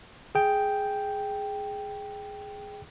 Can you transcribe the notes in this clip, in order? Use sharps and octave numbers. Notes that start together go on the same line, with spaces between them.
G#4 G5